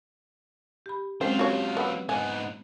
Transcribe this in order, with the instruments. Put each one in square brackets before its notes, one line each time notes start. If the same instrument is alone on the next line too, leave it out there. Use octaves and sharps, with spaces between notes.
[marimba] G4 B5
[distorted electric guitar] F#3 F4 [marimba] G#3 C4 C#4 [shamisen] C5 G5
[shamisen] F#4 C#5 [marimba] G4
[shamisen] B3 [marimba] B4 B5 E6
[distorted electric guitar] G#2 B3 [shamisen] G#5